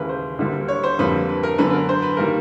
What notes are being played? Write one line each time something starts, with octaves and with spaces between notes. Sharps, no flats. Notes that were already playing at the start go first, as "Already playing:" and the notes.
Already playing: D#2 C#3 E3 G#3 A#4 B4
C5
D2 D3 G3 A#3
C#5
C5
F2 D3 G3 A#3 B4
B4
A#4
F#2 D3 F#3 B3 B4
B4
A#4
C5
B4
D#3 G3 A#3 A#4